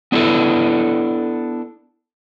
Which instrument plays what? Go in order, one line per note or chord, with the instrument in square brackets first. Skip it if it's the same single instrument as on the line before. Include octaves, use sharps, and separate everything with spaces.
[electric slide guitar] B3 D4 E4 G4 A4 B4